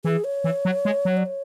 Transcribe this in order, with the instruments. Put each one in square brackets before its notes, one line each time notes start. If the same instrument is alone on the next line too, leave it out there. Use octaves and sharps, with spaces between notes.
[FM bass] E3 [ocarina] G#4
[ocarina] C#5
[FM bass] E3
F#3
G#3
F#3
[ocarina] D5
C#5